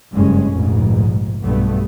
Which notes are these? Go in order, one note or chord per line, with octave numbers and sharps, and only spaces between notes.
F#1 G2 G#3 C#4
F1 A#1 G#2
B1 G2 A3 B3